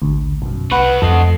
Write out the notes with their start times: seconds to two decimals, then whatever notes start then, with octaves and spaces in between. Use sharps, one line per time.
0.02 A1 D2
0.42 B1 F#2
0.72 C2 A3 B4 F#5
1.02 F2 A4 D#5 C7